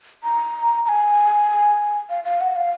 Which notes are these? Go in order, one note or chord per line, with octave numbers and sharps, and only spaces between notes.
A#5
A#5
G#5
F5
F5
F#5
F5